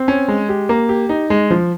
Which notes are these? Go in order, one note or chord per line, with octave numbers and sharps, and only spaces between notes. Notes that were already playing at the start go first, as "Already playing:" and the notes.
Already playing: C4
C#4
G#3
G4
A#3
G4
D#4
G#3
F3